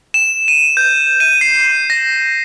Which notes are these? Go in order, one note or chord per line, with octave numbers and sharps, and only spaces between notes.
E7
D#7
G6
D#7
C7
A#6